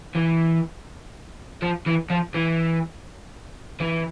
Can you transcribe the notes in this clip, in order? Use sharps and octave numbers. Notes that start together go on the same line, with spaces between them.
E3
F3
E3
F3
E3
E3